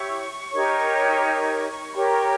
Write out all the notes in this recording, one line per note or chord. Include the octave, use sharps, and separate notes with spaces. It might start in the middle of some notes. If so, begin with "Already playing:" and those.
Already playing: E4 G4 C#5 C#6
D#4 G4 A#4 C#5
G4 A#4 C#5 B5
B5
C#6